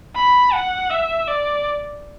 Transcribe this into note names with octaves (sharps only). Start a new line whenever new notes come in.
B5
F#5
E5
D5